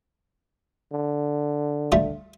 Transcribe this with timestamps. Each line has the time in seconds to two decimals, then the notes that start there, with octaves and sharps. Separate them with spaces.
0.92 D3
1.92 G3 A3 F4